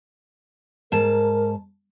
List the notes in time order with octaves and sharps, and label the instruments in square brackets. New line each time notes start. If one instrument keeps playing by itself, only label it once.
[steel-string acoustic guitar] G#2 A5 [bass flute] A#4